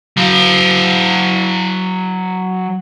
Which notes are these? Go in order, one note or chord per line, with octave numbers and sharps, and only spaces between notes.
F#3 F5